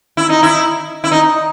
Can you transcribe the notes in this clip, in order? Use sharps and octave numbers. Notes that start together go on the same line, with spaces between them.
E4
D#4
E4
E4
D#4